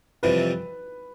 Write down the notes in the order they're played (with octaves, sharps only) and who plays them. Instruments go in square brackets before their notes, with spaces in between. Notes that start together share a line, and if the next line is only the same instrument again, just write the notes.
[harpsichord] F2 C3 E3 G3 [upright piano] B4